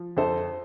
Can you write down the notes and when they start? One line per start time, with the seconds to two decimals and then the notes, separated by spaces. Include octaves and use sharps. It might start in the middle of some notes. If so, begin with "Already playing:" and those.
Already playing: F3
0.17 F2 A4 C5